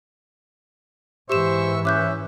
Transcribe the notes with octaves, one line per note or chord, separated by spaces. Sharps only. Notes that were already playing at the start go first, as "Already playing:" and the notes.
G#2 E3 G4 C5 E5 C#6 E6 E7
C#4 E5 D6 F#6 G6